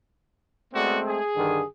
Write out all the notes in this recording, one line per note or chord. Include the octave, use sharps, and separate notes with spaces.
G#3 A3 B3 C4 F#4 D5
G#4
G2 D3 D#3